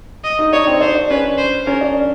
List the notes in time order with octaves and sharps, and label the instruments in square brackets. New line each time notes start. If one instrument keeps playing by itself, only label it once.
[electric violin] D#5
[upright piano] D#4
[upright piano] D4 [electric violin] C#5
[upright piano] C4
[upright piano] D4 [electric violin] C5
[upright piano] D4
[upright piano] C#4 [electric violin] B4
[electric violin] C5
[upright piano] C#4 [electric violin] A#4
[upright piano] D4